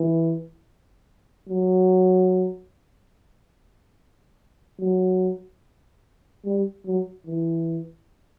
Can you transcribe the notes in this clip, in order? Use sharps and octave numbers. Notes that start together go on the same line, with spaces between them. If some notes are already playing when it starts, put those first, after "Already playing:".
Already playing: E3
F#3
F#3
G3
F#3
E3